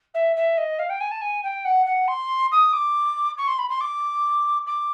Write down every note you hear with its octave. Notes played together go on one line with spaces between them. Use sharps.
E5
E5
D#5
F5
G5
G#5
A5
G#5
G5
F#5
F#5
C6
D#6
D6
C#6
C6
B5
C6
D6
D6